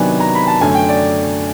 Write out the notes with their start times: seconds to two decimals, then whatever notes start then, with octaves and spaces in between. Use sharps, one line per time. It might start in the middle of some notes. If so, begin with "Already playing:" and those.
Already playing: C3 D#3 F#3 B3 D4 G#5
0.20 A#5
0.35 B5
0.48 A5
0.61 F#2 D3 F#3 A3 G#5
0.75 G5
0.89 D5